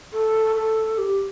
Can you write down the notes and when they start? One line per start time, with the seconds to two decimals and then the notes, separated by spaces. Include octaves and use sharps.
0.13 A4
0.56 A4
0.98 G4